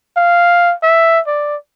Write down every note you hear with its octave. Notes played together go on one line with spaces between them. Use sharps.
F5
E5
D5